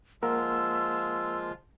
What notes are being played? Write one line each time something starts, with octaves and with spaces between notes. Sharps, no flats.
F3 G#3 A#3 F4 A#4 F#5 E6